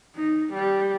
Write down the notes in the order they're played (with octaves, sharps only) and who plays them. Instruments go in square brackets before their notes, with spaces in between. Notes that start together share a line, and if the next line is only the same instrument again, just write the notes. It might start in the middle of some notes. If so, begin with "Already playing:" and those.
[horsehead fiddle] D#4
G3